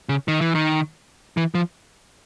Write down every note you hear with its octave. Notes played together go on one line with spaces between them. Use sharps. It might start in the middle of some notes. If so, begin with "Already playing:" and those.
C#3
D#3
E3
D#3
E3
F3